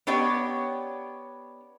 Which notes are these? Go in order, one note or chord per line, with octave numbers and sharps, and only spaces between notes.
B3 D4 G4 C#5 D#5